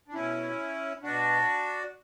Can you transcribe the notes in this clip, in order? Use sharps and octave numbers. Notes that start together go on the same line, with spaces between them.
D4
B2 C#4 E4
B2 D4 F#4